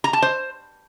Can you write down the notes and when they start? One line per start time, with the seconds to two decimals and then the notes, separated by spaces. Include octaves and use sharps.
0.04 A#5
0.13 A5
0.22 C5